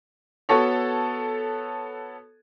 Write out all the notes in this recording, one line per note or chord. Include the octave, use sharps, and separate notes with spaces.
B3 F#4 A4 C#5